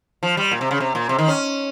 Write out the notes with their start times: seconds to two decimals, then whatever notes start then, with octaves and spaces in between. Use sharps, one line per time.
0.23 F3
0.37 G3
0.52 A#2
0.61 C3
0.71 C#3
0.80 C3
0.95 A#2
1.09 C3
1.19 D#3
1.28 C#4